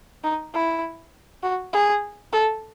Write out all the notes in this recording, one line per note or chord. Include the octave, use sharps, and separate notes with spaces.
D#4
E4
F#4
G#4
A4